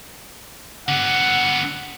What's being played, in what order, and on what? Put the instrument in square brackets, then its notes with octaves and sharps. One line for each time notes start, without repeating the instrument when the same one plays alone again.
[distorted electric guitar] D3 B3 [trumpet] F#5